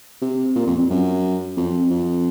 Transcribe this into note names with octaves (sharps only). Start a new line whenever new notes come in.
C3
A#2
F2
F2
F#2
F2
F2